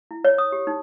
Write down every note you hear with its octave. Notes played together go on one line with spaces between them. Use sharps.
E4
C#5
D#6
G4
D#4